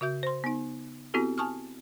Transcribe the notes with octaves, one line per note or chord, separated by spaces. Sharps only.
C#3 F#4 E5 G6
C5 C6
B3 D#4
B3 C4 E4 F#4 G4 A4
G#5 A5 C#6 D#6 F6